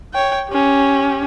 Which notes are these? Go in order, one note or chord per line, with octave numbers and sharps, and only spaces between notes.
C#5 G5
C#4 G4